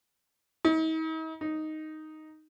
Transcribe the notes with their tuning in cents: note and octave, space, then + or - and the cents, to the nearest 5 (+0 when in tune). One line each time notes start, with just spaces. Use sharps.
D#4 +45
D#4 +0